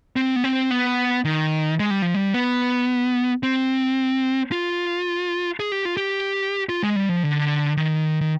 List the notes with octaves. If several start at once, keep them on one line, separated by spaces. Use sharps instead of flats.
C4
B3
C4
B3
D#3
G#3
G3
F3
G3
B3
C4
F4
G#4
G4
F4
G4
F4
G#3
G3
F3
D3
D#3
D#3